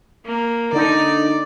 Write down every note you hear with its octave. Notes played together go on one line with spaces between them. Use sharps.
A#3
D3 D#4 D5